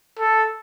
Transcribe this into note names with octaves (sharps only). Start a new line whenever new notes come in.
A4